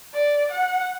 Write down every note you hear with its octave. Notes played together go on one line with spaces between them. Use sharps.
D5
F#5